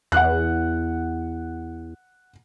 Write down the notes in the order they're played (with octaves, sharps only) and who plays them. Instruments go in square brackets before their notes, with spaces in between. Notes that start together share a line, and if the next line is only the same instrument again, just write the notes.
[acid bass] E2 [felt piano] F#5 F#6